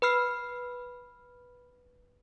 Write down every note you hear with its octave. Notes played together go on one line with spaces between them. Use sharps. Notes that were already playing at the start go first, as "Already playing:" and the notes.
B4 B5 F6 C7